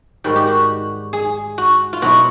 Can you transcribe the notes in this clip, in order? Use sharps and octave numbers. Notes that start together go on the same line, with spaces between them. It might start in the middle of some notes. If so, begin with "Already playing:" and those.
G#2 D#3 G3 F#4
G4
F#4
G#4
F#4
F4
B2 F#3 B3 E4 F#4